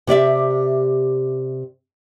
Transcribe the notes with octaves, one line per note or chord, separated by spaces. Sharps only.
C3 G4 D5 E5